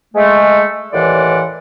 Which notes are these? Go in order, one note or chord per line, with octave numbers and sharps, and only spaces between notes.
G#3 A3
D#2 A2 E3 D5 F#5 C6